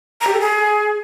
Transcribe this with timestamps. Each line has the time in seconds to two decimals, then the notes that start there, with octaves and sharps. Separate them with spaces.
0.21 A#5
0.27 G4
0.33 A4
0.40 G#4